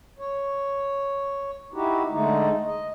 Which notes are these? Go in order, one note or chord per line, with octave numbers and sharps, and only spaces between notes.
C#5
D#4 E4 F#4 G4
D3 G#3 A3 D#4
D#5